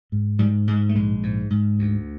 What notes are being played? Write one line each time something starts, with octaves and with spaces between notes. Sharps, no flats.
G#2
G#2 G3
G#2 G#3
A3
A#1 G#3
G#2
G#2
D2